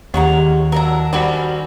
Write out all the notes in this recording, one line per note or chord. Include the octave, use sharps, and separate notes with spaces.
D#2 D#3 G3 G#3 C#4 C#5 F#5 A#5
F#3 D4 E4 A#4 A#5
G3 C4 C#4 F#4 A#4 B5